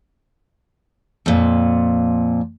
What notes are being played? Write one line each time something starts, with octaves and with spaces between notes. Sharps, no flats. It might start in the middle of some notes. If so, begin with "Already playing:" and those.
F2 A#2